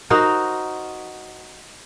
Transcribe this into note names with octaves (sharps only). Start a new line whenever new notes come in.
D#4 F#4 A#4 C5